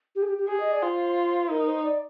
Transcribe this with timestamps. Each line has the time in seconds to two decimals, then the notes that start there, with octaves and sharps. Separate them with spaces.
0.15 G4
0.22 G#4
0.27 G4
0.38 G4
0.49 G4 G#4
0.60 D#5
0.72 D5
0.83 F4 C5
1.50 D#4 A#4
1.68 C5
1.84 D5